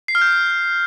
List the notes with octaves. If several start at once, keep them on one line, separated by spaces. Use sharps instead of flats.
C7
F6
G6